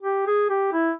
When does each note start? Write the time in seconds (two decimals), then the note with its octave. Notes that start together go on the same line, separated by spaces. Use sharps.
0.03 G4
0.27 G#4
0.49 G4
0.73 E4